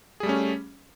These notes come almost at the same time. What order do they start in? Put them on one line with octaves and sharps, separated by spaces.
G#4 G3 A3 C#4